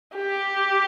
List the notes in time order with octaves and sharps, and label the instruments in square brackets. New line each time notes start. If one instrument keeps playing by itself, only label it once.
[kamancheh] G4